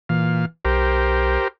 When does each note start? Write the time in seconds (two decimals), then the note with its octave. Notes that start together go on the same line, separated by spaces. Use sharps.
0.09 A#2 E3 F5
0.65 B1 G4 A#4 C5